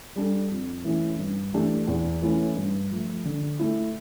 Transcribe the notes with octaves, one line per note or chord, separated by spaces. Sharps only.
G3 D4 A4
F2
E3 A3 C#4 E4
G2
E3 A3 D4 G4
E2
E3 A3 C#4 E4
G2
F3 A3
D3
A3 E4